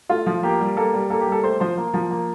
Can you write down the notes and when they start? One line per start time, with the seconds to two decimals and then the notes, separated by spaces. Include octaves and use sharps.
0.09 A3 F4
0.26 F3
0.43 A#3 G4
0.60 G3
0.77 A#3 A4
0.93 G3
1.10 A#3 A4
1.21 G4
1.27 G3
1.32 A4
1.44 A3 C5
1.60 F3 C5
1.77 A#3
1.94 F3
2.11 A#3